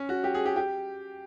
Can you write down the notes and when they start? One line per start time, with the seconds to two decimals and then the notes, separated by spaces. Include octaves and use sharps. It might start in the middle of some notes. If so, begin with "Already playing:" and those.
Already playing: C#4
0.09 F#4
0.24 G4
0.35 G#4
0.45 G4
0.56 G4